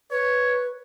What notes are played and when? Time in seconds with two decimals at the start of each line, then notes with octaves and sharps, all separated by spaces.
0.11 B4 C#5